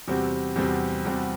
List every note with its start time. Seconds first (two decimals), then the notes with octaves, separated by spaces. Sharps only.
0.08 E2 C3 G3 C4 F#4
0.56 E2 C3 G3 C4 F#4
1.05 E2 C3 G3 C4 F#4